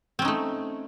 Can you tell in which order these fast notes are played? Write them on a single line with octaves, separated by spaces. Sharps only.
C4 C#4 D#4 A3